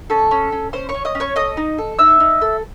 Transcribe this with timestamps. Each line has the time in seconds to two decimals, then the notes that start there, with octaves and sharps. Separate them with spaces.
0.10 C#4 A4 A5
0.31 C#4
0.52 C#4
0.73 C#4 C5 C6
0.89 C#5 C#6
0.94 C#4
1.05 D#5 D#6
1.15 C#4
1.20 C#5 C#6
1.36 A4 D#5 D#6
1.57 D#4
1.78 A4
1.99 D#4 E5 E6
2.20 D#4
2.41 A4